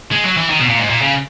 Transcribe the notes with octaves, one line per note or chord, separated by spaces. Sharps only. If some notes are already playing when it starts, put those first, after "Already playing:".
G#3
F#3
E3
D#3
B2
A#2
G#2
A#2
C#3